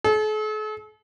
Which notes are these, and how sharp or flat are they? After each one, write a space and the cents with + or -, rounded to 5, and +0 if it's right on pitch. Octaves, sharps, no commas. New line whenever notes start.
A4 -45